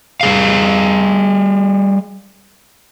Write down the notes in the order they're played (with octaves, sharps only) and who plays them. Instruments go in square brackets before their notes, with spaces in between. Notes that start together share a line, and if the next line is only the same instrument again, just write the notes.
[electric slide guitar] G3 G#4 F5